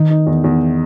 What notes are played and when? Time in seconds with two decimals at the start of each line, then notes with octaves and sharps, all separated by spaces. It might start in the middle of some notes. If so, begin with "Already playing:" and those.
Already playing: D#3 D#4
0.10 D#4
0.27 E2
0.44 E2